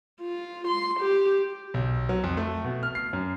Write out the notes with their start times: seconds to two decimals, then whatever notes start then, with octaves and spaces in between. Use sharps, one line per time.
0.21 F4
0.68 C6
1.00 G4
1.74 B1
2.09 F#3
2.24 F2
2.37 A3
2.64 B2
2.83 F6
2.95 C7
3.13 F#2